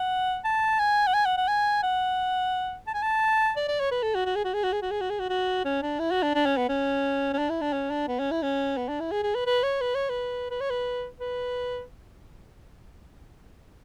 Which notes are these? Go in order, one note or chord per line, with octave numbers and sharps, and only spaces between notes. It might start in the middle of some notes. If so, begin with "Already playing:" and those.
Already playing: F#5
A5
G#5
F#5
G#5
F#5
F#5
G#5
F#5
A5
G#5
A5
D5
D5
C#5
B4
A4
F#4
F#4
G#4
F#4
G#4
F#4
G#4
F#4
G#4
F#4
G#4
F#4
F#4
C#4
D4
E4
F#4
D4
D4
C#4
B3
C#4
C#4
D4
E4
D4
C#4
D4
B3
C#4
E4
C#4
B3
D4
E4
G#4
G#4
B4
B4
C#5
B4
C#5
B4
B4
C#5
B4
B4